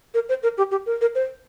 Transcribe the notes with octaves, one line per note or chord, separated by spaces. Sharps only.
A#4
C5
A#4
G4
G4
A#4
A#4
C5